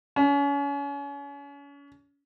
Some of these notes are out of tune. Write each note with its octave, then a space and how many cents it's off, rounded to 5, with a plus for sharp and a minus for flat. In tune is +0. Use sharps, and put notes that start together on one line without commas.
C#4 +35